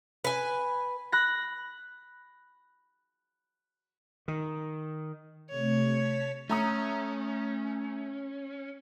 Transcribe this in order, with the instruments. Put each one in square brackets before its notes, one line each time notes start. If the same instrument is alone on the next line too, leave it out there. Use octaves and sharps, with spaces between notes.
[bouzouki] B4 G#5
[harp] B5 F#6 A#6
[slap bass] D#3
[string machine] C3 A3 [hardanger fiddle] C#5
[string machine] A5 B6
[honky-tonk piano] A3 A#5 D#6 [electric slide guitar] C#4